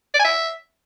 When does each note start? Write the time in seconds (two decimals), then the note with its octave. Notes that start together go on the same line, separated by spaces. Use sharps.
0.14 D5
0.19 G#5
0.25 E5